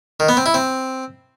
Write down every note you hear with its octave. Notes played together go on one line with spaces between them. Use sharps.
D#3
B3
C4
E4
C4